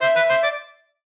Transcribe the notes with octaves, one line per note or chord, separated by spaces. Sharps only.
C5 E5
B4
C5
D5